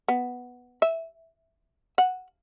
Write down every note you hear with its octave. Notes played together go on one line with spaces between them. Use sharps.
B3
E5
F#5